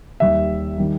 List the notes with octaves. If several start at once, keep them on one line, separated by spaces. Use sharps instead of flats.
D#2 D#3 G3 E5
D#3 G3